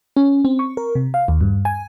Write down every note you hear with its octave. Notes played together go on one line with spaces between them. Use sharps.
C#4
C4
C#6
A#4
C3
F5
D#2
G2
G#5